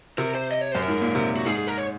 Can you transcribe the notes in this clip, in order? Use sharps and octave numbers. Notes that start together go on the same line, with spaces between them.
C3 A#4
C5
D#5
C#5
C5
F#2
A#4
G#2
A#2
C3
F#4
G#2 G#4
G#4
A#4
C#5